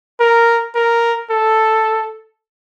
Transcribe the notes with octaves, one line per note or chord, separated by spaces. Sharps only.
A#4
A#4
A4